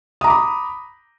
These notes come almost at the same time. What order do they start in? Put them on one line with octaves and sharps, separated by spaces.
D#6 A#5 D6 B5